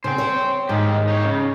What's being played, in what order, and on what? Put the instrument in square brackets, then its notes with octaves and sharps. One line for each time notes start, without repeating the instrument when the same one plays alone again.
[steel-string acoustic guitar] C#3 [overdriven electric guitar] C5 G5
[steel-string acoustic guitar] C#5
[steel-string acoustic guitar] G#2 [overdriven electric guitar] D#3 G4
[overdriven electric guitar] D#4 C#5
C#3